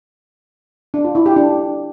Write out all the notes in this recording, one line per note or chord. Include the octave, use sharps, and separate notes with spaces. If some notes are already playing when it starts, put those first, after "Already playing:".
D4
F4
E4
G4
D4